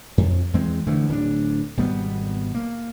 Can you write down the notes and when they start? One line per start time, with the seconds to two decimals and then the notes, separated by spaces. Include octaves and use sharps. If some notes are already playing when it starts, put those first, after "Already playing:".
0.18 F2
0.53 E2 E3 G#3 C4
0.87 D3 E3 F3 A3
1.09 D1 C#4 D4
1.77 G#1 B2 G3 B3
2.55 A#3